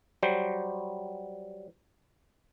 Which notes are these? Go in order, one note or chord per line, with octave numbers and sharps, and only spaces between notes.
F#3 G3 C5